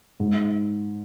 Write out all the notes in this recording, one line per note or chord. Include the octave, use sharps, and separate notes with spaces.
G#2